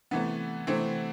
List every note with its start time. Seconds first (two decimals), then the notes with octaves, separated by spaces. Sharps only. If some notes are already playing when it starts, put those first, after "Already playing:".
0.11 C3 E3 A3 B3
0.67 C3 E3 A3 C4